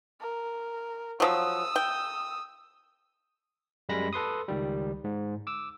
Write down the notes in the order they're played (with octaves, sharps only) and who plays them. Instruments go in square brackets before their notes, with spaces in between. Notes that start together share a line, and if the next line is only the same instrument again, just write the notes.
[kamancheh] A#4
[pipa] F3 F#3 [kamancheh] D#6 E6
[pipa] G5
[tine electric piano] F#2 G3 G#3 B5 A#6
A4 B4 C6 D#6
C#2 D#3 G3
G#2
D6 E6